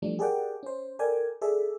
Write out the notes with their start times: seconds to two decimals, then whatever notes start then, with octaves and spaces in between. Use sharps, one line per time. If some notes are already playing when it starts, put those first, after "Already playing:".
0.02 E3 F3 G3 A3 D4
0.19 G4 G#4 A#4 D5 F#5 G5
0.63 C#4 C5
0.99 A4 A#4 D5 G5 G#5
1.42 G#4 A4 D5 E5